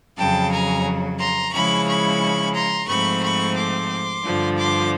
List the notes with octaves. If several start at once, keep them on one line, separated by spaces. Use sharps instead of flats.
F2 C#3 F#3 G5 A5
G#5 A#5
A#5 C6
C#3 F3 G#3 C#4 E4 B5 C#6
B5 C#6
A#5 C6
G#2 F3 A3 C4 B5 C#6
B5 C#6
C6 D6
G2 D3 F3
C6 D6